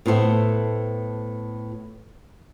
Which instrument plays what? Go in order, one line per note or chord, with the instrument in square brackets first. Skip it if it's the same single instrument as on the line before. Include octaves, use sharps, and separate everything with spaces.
[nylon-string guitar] A2 B3 A4 C5 E5